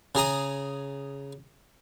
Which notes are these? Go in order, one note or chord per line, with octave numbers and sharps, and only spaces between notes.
C#3 G#4 A#5 D#6